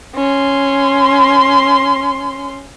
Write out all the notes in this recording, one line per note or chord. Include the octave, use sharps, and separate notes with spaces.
C#4 C6